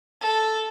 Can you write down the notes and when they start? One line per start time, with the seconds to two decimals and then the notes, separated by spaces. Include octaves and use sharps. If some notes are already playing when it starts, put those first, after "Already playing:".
0.21 A4